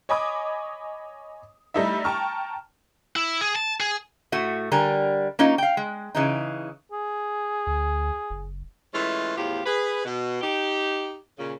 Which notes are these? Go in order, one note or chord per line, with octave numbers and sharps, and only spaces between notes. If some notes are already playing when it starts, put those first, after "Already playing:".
C#5 D#5 G#5 B5 D6 D#6
G3 A3 D#4 E4 E5
G5 A5 A#5 C#6 F6
E4
G#4
A5
G#4
A2 A3 F#4
D3 G3 A#4 G#5
A#3 C#4 D#4 F4
F5 G5
G#3
C#3 E3 D#4
G#4
D2
F#1
E3 G#3 A3 C#4 F4
E2 A2 F3 F4 G4
G#4 B4
B2
D#4 G4
A#2 C#3